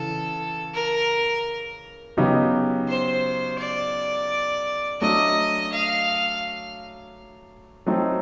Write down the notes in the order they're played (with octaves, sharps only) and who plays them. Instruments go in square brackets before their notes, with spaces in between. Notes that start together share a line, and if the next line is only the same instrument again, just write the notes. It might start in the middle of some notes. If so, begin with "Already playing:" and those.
Already playing: [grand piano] C#3 E3 [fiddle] A4
[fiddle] A#4
[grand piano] C#3 F#3 B3 D#4 G4
[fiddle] C5
D5
[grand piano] F#3 A3 D4 F#4 [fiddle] D#5
[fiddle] F5
[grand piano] F#3 A3 C4 D#4